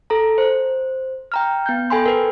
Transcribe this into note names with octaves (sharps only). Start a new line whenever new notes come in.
A4 A#5
C5
G5 A#5 F6
B3 G6
A4 G5 G#5 B5 C6
A#4 B4